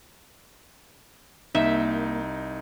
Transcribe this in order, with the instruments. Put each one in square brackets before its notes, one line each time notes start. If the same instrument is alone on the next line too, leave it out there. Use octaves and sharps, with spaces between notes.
[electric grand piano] C2 D#4 [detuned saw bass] A#3 [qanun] E5